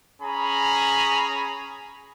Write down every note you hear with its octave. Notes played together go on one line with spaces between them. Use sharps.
C#4 G#4 A#5 B5